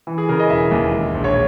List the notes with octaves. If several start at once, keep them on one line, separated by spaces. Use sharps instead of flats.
E3
G#4
C#3 A#4
D#5
E1 E5
D#2
G#3
A#1
C#5